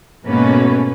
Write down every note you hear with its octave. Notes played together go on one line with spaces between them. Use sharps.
G#2 B2 A3 A#3 C#4 B4